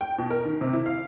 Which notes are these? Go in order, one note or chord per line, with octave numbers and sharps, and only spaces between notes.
G5
B2
A#4
D#3
C3
E4
F5